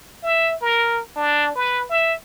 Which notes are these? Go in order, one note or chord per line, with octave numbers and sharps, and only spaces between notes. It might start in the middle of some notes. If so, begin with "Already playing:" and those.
E5
A#4
D4
B4
E5